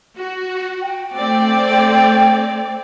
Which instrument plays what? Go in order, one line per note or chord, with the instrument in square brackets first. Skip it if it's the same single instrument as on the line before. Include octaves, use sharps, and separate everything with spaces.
[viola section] F#4
[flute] G5
[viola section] A3 C4 D5